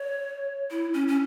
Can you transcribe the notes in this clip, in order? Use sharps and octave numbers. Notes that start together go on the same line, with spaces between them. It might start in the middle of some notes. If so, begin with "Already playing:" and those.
Already playing: C#5
E4
C#4
C#4